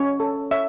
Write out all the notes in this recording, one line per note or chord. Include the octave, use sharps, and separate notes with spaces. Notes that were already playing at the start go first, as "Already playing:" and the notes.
Already playing: C#4 C#5
A4
C#5 E5